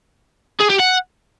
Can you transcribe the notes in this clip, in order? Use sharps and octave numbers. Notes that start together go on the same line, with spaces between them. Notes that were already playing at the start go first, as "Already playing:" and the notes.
G#4
G4
F#5